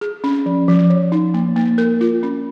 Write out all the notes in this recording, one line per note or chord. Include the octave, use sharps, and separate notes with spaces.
G#4
C#4
F3
F3
C#5
D#4
A#3
A#3
A#4
F4
C#4